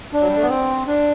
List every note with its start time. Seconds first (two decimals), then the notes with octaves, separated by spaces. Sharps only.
0.13 D4
0.21 F#3
0.28 G3
0.36 A3
0.42 B3
0.49 C4
0.87 D4